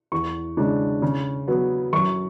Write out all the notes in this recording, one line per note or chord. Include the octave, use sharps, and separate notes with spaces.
E2 C#6
C#3 G#3 D4
C#3
F#3 B3
F#2 C#6